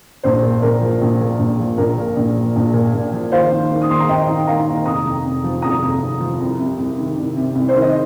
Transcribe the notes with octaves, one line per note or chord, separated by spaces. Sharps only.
A#1 C5
A#2
A#1 A#4
F3
A#1
A#2
A#1
F3
A#1 A#4
A#2
A#1
F3
A#1
A#2
A#1
F3
D#2 C5 F5
D#3
D#3
D#6
D#2 C6
A#5
D#2 D#5 G5
D#3
D#3 F5 A#5
D#2
F1 A#5 D#6
F2
F1
F3
F1 A#5 D#6
F2
F1
F3
C2
C3
C2
D#3
C2
C3
C2
C5
D#3
D#5